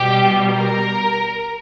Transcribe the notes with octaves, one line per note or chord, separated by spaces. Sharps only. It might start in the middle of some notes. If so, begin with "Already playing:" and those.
Already playing: B2 G3 G4
A#4